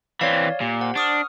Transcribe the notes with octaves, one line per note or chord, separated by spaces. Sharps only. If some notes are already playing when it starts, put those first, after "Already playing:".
E3 C4 C#5 D5 F5
A#2 G4
C5 F#5
D4 C#6 D#6 F6